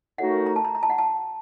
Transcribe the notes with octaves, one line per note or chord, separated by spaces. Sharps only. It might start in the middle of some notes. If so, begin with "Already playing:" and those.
A2 A3 D#4 F#4 A#4 F#5
A#5
A5
A#5
A#5
A5
F#5
A5